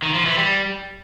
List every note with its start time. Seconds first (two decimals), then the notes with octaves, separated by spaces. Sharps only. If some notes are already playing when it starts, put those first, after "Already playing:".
0.02 D#3
0.14 F3
0.26 E3
0.37 G3